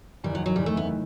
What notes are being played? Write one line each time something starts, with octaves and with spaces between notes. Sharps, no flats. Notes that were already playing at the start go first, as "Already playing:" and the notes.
F#1 E2 D#3 G3
F#3
F#3
F#1 E2 D#3 G3
A3
B3